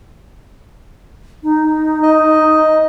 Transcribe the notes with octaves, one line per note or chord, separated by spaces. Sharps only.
D#4
D#5